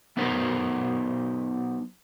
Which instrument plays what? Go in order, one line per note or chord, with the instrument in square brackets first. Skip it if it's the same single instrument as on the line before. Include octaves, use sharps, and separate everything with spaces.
[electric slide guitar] F#3 B3 D#4 A#4 C5